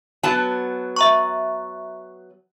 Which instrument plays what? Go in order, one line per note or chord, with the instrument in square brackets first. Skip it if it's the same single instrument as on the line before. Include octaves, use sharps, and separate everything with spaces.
[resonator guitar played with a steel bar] F#3 B3 A5
[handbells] E5 A#5 C#6